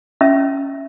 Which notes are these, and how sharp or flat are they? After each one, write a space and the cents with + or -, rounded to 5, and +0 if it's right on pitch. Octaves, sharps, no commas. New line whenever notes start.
C#4 +0 E5 +0